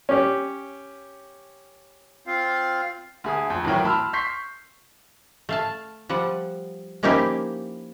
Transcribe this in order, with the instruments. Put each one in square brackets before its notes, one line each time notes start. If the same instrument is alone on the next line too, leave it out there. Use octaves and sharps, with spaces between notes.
[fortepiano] C#4 G4
[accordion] C4 F4 F5
[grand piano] D2 G#4 D#6
F2
G#1 A2 E3 F#3 A#4 G5
A5 B5 C6 E6 F6
C6 C#6 G6 B6 C7
[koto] A3 F5 A5
F3 G3 F#5
F3 A#3 C#4 D#4 E4 G4